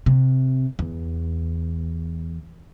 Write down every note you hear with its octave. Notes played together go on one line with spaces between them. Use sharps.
C3
E2